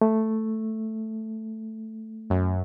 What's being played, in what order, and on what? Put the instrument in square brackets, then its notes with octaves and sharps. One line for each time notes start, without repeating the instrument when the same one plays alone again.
[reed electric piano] A3
[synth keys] F#2